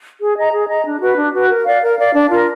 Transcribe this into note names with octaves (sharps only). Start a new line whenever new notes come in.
G#4
D#5 A#5
G#4
D#5 A#5
D4
F#4 B4
D4
F#4 B4
A#4
D5 F5
A#4
D5 F5
D4
F4 A#4